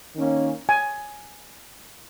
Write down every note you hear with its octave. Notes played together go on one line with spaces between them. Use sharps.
D#3 A#3 C#4
G#5